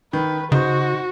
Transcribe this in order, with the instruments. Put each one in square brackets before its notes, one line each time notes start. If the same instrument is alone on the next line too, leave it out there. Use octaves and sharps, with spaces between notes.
[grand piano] D#3 [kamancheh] B4
[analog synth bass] C#3 [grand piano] D#4 C5 [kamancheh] F#4